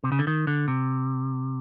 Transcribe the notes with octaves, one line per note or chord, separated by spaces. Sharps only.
C3
C#3
D3
D#3
D3
C3